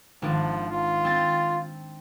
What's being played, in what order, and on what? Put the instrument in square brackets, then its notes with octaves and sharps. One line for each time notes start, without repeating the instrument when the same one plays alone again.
[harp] G#1 D4 [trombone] F3
[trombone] F4
[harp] C4 A6